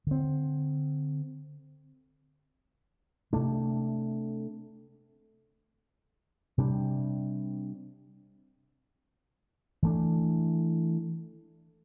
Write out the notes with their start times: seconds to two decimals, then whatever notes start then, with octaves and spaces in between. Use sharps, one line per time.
0.07 D3 C4
3.33 C3 A3 D4
6.58 C3 G3 D4
9.83 E3 A3 D4